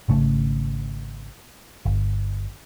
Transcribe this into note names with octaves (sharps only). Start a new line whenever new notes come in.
G#1 C#3 A3
G1